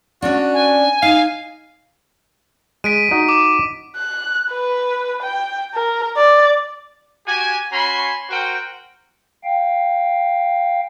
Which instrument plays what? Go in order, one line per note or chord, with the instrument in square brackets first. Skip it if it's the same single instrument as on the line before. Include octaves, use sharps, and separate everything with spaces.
[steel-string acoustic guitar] C#4 D4 [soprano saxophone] F#4
[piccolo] G#5
[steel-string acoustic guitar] D#4 [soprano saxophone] F5
[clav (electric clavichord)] G#3 [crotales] B6 D7 D#7
[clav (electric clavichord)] D#4 F#4 D#5
[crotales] D6
[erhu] F#6
B4
G5
A#4
D5
[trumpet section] F#4 G4 G#5
C#4 F#4 G#5 B5 C6
F#4 A#4 C5 F#5 G5
[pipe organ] F5 G5